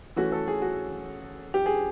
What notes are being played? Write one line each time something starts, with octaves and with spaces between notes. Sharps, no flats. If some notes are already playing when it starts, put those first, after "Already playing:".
E3 A3 C#4 F#4
A4
G#4
F#4
G4
G#4